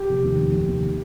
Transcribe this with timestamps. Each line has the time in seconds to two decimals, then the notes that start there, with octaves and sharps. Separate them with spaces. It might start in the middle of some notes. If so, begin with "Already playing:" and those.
Already playing: G4
0.09 F1
0.24 D#2
0.38 F1
0.53 F1
0.68 D#2